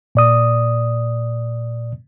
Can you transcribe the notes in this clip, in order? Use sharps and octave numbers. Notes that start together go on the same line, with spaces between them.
A#2 D5 D#6